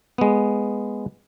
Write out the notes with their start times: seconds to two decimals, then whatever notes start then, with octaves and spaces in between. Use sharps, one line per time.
0.18 G#3 B3